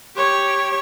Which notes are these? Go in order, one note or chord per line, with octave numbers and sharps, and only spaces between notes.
G4 C#5